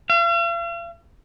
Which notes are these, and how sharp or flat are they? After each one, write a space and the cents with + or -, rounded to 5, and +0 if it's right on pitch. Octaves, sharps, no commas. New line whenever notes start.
F5 -45